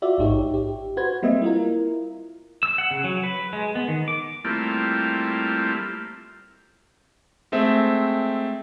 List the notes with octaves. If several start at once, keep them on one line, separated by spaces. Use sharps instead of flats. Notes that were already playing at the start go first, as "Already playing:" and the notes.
F4 F#4 D5 E5
A1 G#2 D#4 G4 C#5
G4
F#4 B4 C5 G#6
G3 A#3 C4 D#5 E5
E4 F4 A#4
E6
F#5
C#3
F#3
B4
G#3
B3
D#3
D6
G3 A3 A#3 C4 E4 F4
G#3 A3 C4 E5